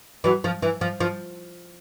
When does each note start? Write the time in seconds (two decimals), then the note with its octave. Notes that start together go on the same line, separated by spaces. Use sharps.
0.24 E3 F#3
0.44 F3
0.62 E3
0.81 F3
1.00 F3